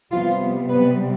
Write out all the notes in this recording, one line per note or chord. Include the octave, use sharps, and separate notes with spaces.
C3 F3 G3 B3 F4
B3 B4